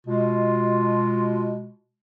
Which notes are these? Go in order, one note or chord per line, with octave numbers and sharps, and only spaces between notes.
B2 G#3 F4